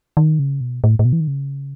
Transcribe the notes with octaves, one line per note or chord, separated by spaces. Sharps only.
D#3
C#3
B2
A2
A2
B2
E3
D#3
C#3